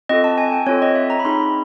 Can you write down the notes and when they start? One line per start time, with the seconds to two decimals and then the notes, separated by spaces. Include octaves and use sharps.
0.09 C4 F4 A4 D#5
0.24 A5
0.38 G#5
0.52 G5
0.67 C4 F4 A4 C#5
0.82 D#5
0.95 E5
1.10 A#5
1.20 B5
1.25 C4 D#4 G#4 C6